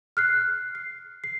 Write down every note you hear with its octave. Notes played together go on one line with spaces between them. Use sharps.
F6 F#6 C7
C7
C7